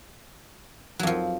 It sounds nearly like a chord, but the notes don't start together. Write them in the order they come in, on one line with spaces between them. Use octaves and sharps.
F#3 F2 F3